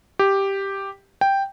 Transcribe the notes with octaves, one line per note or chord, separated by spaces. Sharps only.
G4
G5